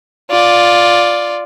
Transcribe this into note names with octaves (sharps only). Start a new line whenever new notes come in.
F4 D5